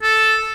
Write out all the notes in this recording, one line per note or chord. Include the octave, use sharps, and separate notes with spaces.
A4